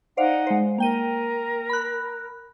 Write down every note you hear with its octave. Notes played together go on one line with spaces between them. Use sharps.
D#4 C5 D5 F5 F#5
G#3 C5
A#3 A#4 G5 D#7
B5 F#6